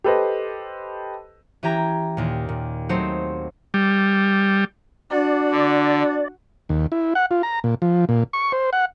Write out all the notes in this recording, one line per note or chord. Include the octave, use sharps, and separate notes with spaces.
G4 A4 B4 C5 D#5
E3 C#4 G4 G5 A#5 G#6
D#2 A#2
A#2
F#3 A3 C4 D#4 C5 C#5
G3
D4 F#4 D5
D3
D#2
E4
F#5
F4
A#5
A#2
F3
A#2
C#6
C5
F#5